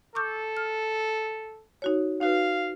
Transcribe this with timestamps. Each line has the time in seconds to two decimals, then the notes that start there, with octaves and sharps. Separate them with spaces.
0.15 A4 C#6 D6 G6
0.57 F6
1.82 D#4 F#4 C#5
2.21 D#4 F#4 B4 F5